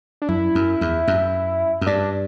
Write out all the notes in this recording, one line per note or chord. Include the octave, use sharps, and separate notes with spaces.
D4
F#2 E4
F#2
E2
F#2
F#2
G2 D4